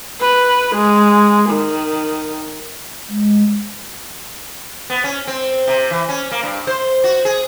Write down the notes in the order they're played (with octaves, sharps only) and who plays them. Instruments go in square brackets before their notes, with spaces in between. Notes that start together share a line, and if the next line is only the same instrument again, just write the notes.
[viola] B4
G#3
D#3
[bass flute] G#3
[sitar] B3
C#4
C4
C3
E3
C#4
A#3
G2
C5
F#4
G#4